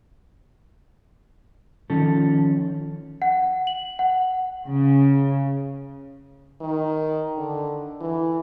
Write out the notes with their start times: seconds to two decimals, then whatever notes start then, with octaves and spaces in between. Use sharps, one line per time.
1.90 D#3 F3 C#4 A4
3.22 F#5
3.67 F#7
3.99 F#5
4.67 C#3
6.61 D#3
7.37 D3
8.01 E3